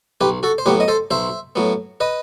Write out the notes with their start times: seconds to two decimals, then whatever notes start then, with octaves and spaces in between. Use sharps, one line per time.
0.21 B1 G4 B4
0.43 F#4 A4
0.58 C5
0.66 A2 F#3 B3 G4 B4
0.80 D#5
0.88 A4 C5
1.11 B1 C5 E5
1.56 A2 F#3 B3
2.00 B4 D#5